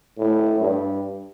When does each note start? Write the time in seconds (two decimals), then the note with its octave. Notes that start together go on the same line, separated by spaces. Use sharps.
0.18 A2
0.61 G2